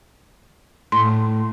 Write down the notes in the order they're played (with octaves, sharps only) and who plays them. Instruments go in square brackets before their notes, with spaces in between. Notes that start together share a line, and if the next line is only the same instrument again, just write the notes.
[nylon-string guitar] A2 [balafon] C6